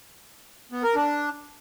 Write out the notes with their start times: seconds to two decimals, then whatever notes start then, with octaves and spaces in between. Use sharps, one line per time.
0.72 B3
0.84 A#4
0.95 D4